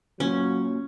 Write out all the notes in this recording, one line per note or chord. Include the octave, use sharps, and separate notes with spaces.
F#3 A#3 C#4 F4 F#4